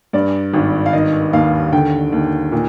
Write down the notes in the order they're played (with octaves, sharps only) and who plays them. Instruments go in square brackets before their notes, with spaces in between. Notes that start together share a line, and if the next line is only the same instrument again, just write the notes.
[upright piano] G2 D5
G#1
F5
D#3 D#5
D#2 F5
D3 G5
D#2
A#2